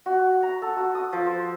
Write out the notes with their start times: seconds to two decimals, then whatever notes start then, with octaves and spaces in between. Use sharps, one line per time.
0.06 F#4
0.43 A#5
0.62 A4
0.76 F#4
0.95 D#6
1.13 F3
1.26 C5